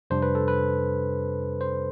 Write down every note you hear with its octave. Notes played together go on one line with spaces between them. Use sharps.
F2 C3 G3 D4 C5
B4
A4
B4
C5